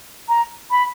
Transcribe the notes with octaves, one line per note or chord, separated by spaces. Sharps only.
A#5
B5